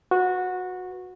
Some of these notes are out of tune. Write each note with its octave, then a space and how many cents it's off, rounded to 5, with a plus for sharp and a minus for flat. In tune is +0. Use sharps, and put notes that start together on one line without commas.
F#4 -15 B4 +0